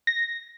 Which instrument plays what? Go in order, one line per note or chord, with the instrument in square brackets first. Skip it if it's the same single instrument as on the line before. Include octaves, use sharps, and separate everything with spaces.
[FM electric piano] A#6